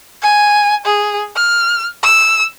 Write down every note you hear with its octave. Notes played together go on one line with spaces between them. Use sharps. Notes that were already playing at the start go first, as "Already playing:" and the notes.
G#5
G#4
F6
E6